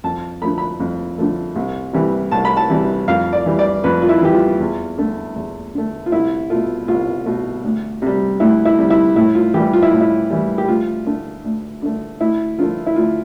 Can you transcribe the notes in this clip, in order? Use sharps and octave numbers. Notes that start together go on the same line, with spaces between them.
F2 A5
D3 F3 A3 B5
B5
F2
D3 F3 A3
C2
C3 E3 G3
C2 A5
B5
A5
C3 E3 G3
F2 F5
D5
E3 G3
D5
F2 B4
F4
E4
E3 G3 G4
F4
E2
D3 A3
E2
D3 A3
F4
C2 E4
B2 A3 F4
C2 F4
B2 A3
D2
C3 G3
D2 E4
E4
C3 G3
E4
A2 E4
F4
E3 G3 G4
F4
E4
A2
E4
E3 G3
G4
D2 F4
D3 A3
D2
D3 A3
D2 E4
D3 F3 A3 F4
E4
D2 F4